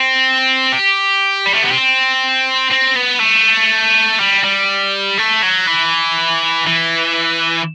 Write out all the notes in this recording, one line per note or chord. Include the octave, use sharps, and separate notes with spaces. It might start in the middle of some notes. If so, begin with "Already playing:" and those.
Already playing: C4
G4
G3
A3
B3
C4
C4
B3
A3
G3
G3
A3
F#3
E3
E3